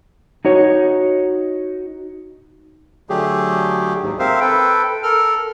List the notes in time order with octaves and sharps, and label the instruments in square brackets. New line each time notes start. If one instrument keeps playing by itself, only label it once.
[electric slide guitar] D#4 F#4 C#5
[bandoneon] D3 F#3 A3 G4 G#4
D#2 G#2
C4 A#4 C5 E5 F5
A4 B4 G5
A4 A#4 F6